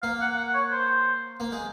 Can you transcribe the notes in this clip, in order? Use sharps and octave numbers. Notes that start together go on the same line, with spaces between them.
A#3 F5
F#5
F#5
C#5
C5
A#3
G#3